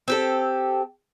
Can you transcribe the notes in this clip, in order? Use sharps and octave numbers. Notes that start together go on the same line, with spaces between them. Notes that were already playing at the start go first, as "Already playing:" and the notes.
C4 G4 A4